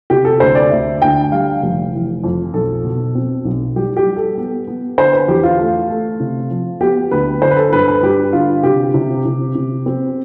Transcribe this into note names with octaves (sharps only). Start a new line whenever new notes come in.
C3 G4
A4
D2 C5
D5
D2 E5
D2 G5
G3 F5
F1
E3
F2
B1 A4
B2
C4
B1
G3 G4
G4
G3
A4
B3
B3
D3 C5
B4
E2 G4
F4
A3
A3
C3
F3
B3 G4
D2 B4
D3 C5
B4
A4
G2 B4
B4
G2 G4
D3 F4
C3 G4
C3
C3
C3
C4